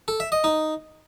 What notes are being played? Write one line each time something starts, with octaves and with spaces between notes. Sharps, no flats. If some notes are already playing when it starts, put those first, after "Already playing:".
A4
E5
D#5
D#4